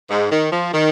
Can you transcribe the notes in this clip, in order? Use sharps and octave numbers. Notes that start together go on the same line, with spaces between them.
G#2
D#3
F3
D#3